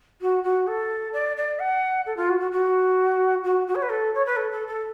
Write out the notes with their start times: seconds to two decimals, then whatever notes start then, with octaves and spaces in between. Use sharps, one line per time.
0.21 F#4
0.43 F#4
0.67 A4
1.13 D5
1.37 D5
1.59 F#5
2.06 A4
2.17 F4
2.29 F#4
2.40 F#4
2.51 F#4
3.44 F#4
3.67 F#4
3.75 C#5
3.82 B4
3.89 A4
4.15 C#5
4.26 B4
4.36 A4
4.52 A4
4.67 A4